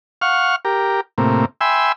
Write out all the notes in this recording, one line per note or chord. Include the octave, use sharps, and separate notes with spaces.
F5 F#5 C#6 F6
G4 A#4
A2 C3 A#3
E5 G5 G#5 B5 C6 E6